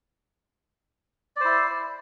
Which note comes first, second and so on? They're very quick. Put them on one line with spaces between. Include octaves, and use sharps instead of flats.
D5 C5 E4